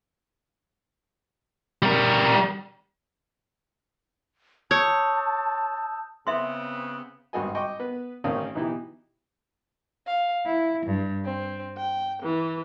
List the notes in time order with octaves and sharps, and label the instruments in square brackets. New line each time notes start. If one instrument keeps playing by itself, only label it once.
[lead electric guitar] G3 A#4
[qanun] C#5 [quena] A5 [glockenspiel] D#6 E6 G6
[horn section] C#3 B3 C4 [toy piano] E5 C6
[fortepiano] G#1 G2 F#4 G#4 D#5 G#5
D#5 G5 C#6 D6
B3 B4
A1 D#3 C4 C#4 F5 D#6
B2 E3 D#4 E4 G4
[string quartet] F5
E4
G2
C4
G5
E3